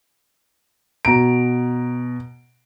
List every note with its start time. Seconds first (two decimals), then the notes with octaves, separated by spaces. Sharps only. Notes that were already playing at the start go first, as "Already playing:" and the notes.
1.05 B2 A#5 D7